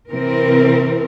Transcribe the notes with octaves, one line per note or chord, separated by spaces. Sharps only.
C3 E3 C4 A#4